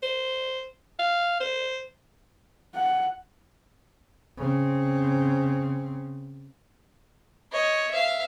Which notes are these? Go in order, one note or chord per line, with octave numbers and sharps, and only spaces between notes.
C5
F5
C5
F#5
C#3 C4
C#5 D#5
E5 F5